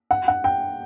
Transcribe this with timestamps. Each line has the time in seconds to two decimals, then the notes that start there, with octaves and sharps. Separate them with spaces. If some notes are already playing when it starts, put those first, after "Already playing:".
0.11 F#5
0.28 F#5
0.44 G5